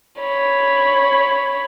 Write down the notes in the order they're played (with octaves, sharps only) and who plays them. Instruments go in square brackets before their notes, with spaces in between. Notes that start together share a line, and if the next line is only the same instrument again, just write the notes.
[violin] C#5 B5